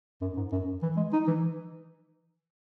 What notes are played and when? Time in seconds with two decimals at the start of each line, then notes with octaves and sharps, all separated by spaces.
0.21 F#2
0.37 G#2
0.52 F#2
0.83 E3
0.97 G#3
1.13 D#4
1.28 E3